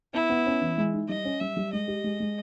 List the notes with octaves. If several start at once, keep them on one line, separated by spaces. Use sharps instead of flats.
B3 E4
B3
C#4
E3
G#3
D#4
G3 D#5
C#4
G3 E5
G3
G#3 D#5
G4
G#3
G#3